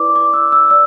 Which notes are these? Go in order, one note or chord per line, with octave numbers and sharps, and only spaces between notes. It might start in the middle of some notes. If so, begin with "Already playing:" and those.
Already playing: E4 B4 D5 D6
D6
E6
E6
D5 E6